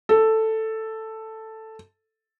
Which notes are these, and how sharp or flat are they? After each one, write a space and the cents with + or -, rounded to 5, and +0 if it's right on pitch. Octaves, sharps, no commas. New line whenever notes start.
A4 +5